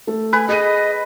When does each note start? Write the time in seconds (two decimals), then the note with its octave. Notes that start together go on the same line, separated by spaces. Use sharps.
0.07 A3 A4
0.33 B4 G#5
0.49 G#4 D#5 D#7